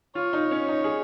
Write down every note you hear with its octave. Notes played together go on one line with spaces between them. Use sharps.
F4 C#5
D#4
C#4
D#4
G#4